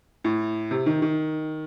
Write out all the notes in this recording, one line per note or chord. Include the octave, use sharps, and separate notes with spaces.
A2
C3
D#3
D#3